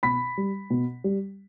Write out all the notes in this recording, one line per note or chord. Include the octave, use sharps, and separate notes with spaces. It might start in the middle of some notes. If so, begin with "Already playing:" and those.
B2 B5 B6
G3
B2
G3